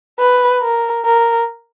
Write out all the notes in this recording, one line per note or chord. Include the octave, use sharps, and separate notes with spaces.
B4
A#4
A#4